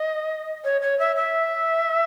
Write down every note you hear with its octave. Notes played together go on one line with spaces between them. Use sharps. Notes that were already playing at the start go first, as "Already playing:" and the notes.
Already playing: D#5
C#5
C#5
E5
E5